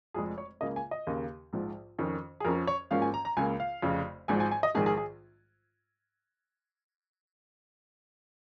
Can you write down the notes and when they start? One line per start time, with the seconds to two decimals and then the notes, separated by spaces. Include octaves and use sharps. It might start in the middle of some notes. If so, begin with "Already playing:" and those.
0.14 F1 F2 F3 G#3 G#4
0.38 C#5
0.61 C#2 C#3 A#3 D#5
0.76 G#5
0.91 D#5
1.07 D#2 C#3 A#3
1.53 A#1 G#2 F3
1.98 F2 D#3 C#4
2.40 G#4
2.45 F2 F3 C#4 A#4
2.67 C#5
2.91 G#1 G#2 F3 A#3 C#4 F5
3.02 G#5
3.14 A#5
3.25 A#5
3.37 C#2 C#3 A#3 G#5
3.60 F5
3.82 F1 F2 C#3
4.28 G#1 G#2 F3 G#5
4.40 G#5
4.51 G#5
4.63 D#5
4.75 A#1 G#2 D#3 G#4
4.86 G#4
4.97 G#4